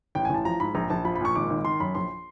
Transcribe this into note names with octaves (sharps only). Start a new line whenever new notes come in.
A1 G5
G#5
A1 A5
F3 A#5
G#2 B5
A#1 A#5
A#1 A5
F3 B5
B5
A#2 C#6
G#1 D6
G#1
D#3 C6
F#2 B5
A#1 C6